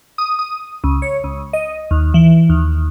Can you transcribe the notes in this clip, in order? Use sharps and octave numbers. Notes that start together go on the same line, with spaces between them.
D#6
D#6
C#2
C#5
C#2
D#5
D#2
E3
D#2